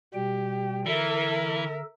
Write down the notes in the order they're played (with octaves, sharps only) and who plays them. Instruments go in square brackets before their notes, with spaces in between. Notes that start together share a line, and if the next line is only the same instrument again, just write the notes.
[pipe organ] B2 G3 G5 [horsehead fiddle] G4
[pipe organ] D3 A4 [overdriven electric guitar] E3 [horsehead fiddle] A#4 E5